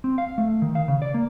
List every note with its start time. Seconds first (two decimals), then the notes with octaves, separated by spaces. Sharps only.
0.04 C4
0.18 F5
0.38 A3
0.62 D#3
0.75 F5
0.88 C#3
1.02 D5
1.14 A#3